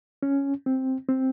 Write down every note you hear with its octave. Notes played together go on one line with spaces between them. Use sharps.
C#4
C4
C4